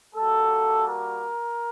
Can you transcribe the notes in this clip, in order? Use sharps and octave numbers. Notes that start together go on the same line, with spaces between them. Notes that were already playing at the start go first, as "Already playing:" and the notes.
G3 A#3 F#4 A4
A#4